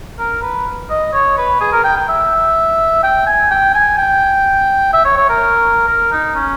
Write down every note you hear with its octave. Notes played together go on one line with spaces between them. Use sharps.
A#4
B4
D#5
C#5
B4
G#4
A#4
G5
G5
E5
G5
G#5
G5
G#5
G5
E5
C#5
C#5
A#4
A#4
D#4
C#4